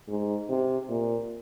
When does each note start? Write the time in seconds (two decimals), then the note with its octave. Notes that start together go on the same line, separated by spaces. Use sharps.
0.08 G#2
0.49 C3
0.89 A#2